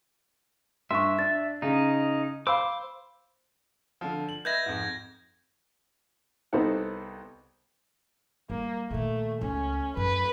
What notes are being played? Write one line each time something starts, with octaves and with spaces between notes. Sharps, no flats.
G2 E5 C6 C#6
D4 A6
C#3 D#4
C5 F5 B5 D6 E6
D3 F3
F#7
B4 D#5 E5 G6 G#6 A#6
F2 G#2
C2 B3 C4 D#4 A4 F#5
G3 A#3
A#2 D#3 A3
C#2 C#4
F#2 B4